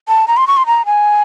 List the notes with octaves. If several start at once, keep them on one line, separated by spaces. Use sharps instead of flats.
A5
A#5
C6
C#6
C6
A#5
G#5